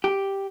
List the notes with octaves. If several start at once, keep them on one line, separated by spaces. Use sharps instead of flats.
G4